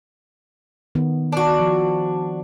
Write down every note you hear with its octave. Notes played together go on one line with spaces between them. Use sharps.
D#3 B3
D4 F#4
F3